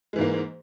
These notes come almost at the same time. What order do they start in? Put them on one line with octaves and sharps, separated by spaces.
G#3 E3 G#2 A#3